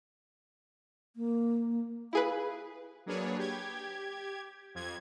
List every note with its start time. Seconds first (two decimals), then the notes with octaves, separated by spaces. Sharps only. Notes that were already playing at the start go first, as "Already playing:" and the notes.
1.16 A#3
2.13 E4 G#4 B4 F5
3.06 F#3 A#3 D4 G#4 B4 C#5
3.38 G4 G#6
4.75 F2 G#6